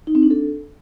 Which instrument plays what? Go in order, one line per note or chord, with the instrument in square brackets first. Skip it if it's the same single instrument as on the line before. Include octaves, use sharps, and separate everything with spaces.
[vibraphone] D#4
C4
D4
A4